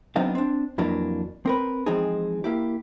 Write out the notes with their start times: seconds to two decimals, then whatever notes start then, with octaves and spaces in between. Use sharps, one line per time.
0.16 F#3 B3 C4 D4 D#4 F5
0.35 C4 D4
0.78 F2 E3 F#3 A#3 D4
1.46 C4 A#4 B4
1.86 E3 F3 G#3 C4 D#4 G#4
2.44 A#3 E4 G4